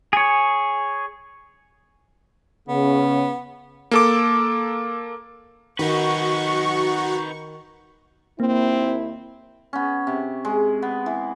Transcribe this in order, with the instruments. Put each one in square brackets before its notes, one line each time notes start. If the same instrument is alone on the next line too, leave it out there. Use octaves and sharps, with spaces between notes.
[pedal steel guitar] G#4 C#5
[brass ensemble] C#3 [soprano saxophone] B3
[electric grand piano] A#3 A4 D6
[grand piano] D#3 [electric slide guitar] D#4 B4 [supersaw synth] F#4 [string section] C#6
[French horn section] D#2 E4 [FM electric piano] A#3 [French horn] C4
[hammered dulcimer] B3 C#4
C3
G#3
B3
E3